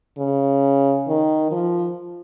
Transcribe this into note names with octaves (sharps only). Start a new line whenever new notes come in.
C#3
D#3
F3